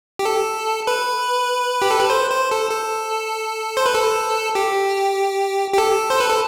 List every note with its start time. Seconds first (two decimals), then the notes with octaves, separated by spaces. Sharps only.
0.19 G4
0.25 A4
0.87 B4
1.82 G4
1.91 A4
2.01 B4
2.10 C5
2.31 C5
2.51 A4
2.71 A4
3.77 C5
3.86 B4
3.95 A4
4.55 G4
5.73 G4
5.78 A4
6.10 C5
6.20 B4
6.30 A4